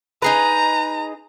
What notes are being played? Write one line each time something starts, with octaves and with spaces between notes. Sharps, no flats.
D#4 G#4 B4 A#5